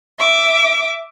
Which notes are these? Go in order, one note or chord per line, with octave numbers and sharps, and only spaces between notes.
E5 D6